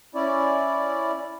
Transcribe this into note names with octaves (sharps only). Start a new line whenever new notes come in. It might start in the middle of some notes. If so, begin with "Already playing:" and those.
C#4 E4 D5